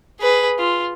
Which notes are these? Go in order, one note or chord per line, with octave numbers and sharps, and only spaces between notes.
G#4 B4
F4